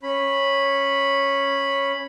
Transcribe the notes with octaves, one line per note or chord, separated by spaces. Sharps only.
C#4 B5